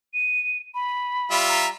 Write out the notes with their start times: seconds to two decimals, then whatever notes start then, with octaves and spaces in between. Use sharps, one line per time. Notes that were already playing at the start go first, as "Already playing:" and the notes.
0.14 D#7
0.75 B5
1.31 G3 F4 E5
1.49 A#5